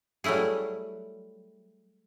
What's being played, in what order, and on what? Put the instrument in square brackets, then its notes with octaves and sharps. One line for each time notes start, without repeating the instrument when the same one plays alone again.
[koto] F#3 G3 A3 E4 G#4